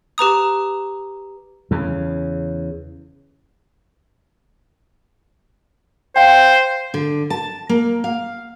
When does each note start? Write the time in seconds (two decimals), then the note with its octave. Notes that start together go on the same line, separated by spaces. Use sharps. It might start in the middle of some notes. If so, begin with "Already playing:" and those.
0.18 G4 B4 A#5 D#6
1.71 E2 C#3
6.16 C5 F5 G5
6.94 D3
7.30 A5
7.69 A#3
8.04 F5